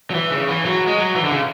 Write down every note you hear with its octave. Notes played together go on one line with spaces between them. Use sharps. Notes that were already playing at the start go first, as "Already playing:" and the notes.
F#3
E3
C#3
E3
F#3
G#3
F#3
E3
D3
C#3